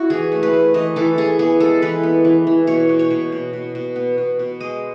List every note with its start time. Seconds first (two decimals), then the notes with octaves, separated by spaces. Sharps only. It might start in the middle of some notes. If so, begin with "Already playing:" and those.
Already playing: E4 F#4
0.10 E3 G#4
0.32 A3
0.43 B4
0.53 A3
0.74 E3 D#5
0.96 E3 A4
1.18 E3 G#4
1.39 B3 G#4
1.60 G#3 A4
1.82 E3 B4
2.03 B3
2.25 E3
2.47 E3
2.67 B2 C#5
2.89 B2
2.99 C#5
3.10 B2
3.32 B2
3.53 B2
3.75 B2
3.96 B3
4.18 B2
4.39 B2
4.60 G#3 D#5